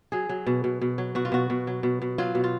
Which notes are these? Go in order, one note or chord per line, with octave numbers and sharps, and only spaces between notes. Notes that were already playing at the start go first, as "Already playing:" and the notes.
F#3 G#4
F#3
B2
B2
B2
F#3
B2 F#4
F4
B2 F#4
B2
F#3
B2
B2
F#3 F4
B2
F4